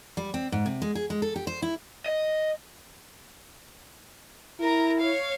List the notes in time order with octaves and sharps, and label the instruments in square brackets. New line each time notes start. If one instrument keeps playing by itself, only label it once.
[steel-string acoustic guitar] G3
C4
G#2
C3
G#3
G#4
G#3
A4
G4
C5
E4
[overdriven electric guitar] D#5
[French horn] E4 [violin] A#4 A#5
[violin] C#5 F5